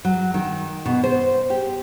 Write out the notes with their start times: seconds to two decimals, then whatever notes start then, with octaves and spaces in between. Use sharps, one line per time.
0.05 F#3
0.34 D#3
0.86 B2
1.04 C5
1.50 G4